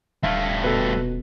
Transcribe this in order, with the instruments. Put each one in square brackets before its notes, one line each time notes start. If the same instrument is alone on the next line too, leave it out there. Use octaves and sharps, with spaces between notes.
[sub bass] D#1 [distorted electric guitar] G2 A3 [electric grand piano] E5 F5
[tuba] B2 [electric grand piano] A4 B4